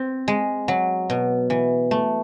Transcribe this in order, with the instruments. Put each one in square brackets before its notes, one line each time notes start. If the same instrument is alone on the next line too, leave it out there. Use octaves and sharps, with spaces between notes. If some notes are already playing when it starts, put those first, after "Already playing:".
Already playing: [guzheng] C4
G#3
F#3
B2
E3
A3